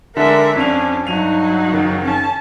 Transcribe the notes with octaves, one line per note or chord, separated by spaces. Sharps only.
D3 G#3 D4 A#4 E5
F2 C#4 D4 D5 F7
G2 F#3 D#4 D#7 F7
F#1 D#3
C#4 A5